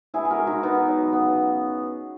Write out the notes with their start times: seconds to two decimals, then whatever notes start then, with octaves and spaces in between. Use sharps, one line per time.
0.14 B2 E4 G#4
0.25 G#4
0.30 F#4 A#4
0.38 G#3
0.47 D#4 F#4
0.63 B2 B3 D#4
0.88 F#3
1.13 C#3 B3